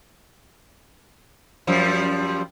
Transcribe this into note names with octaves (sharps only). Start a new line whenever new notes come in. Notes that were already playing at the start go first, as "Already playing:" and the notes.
F#2 F3 G3